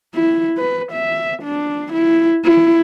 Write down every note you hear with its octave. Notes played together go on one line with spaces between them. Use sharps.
E4
B4
E5
D4
E4
E4